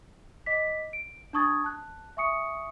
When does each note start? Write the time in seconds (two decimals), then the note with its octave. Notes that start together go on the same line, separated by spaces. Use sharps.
0.46 D#5 D6 B6
0.93 D7
1.33 D4 A5 C#6 D#6 G#6 A6
1.64 A5 F#6
2.17 E5 G#5 C#6 D#6 C#7